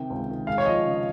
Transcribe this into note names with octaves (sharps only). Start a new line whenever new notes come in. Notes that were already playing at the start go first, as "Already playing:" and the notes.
Already playing: C3 D#3 G5
C#2
D#3
G#3 F5
C#5
F3 D#5
C#3